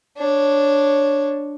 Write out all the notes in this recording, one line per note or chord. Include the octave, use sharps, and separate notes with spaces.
D4 C#5